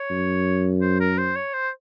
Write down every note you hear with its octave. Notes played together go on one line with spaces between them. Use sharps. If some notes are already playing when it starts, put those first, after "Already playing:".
Already playing: C#5
F#2
C5
A#4
C5
C#5
C5